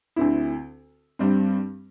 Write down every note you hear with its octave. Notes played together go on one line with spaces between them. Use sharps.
D2 D3 C4 E4
G2 G3 C4